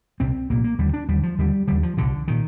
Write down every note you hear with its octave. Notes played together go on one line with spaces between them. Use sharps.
C2 A#2 C4
C2 A#2 A#3
A#3
D#2 D3 G3
D4
D#2 D3 G3
F3
D#2 D3 G3
D#2 D3 G3
F3
C2 A#2 D3
A#2 D#3